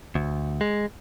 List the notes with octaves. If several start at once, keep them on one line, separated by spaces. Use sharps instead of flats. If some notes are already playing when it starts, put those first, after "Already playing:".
D2
G#3